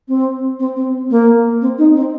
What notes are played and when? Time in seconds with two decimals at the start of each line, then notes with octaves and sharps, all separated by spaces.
0.08 C4
0.59 C4
0.76 C4
1.10 A#3
1.61 C4
1.78 D#4
1.96 C4